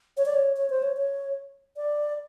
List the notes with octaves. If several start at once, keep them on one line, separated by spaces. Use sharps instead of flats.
C#5
D5
C#5
C#5
C5
C#5
C#5
D5